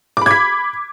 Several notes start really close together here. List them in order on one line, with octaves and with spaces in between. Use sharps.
D6 B5 G#6 B6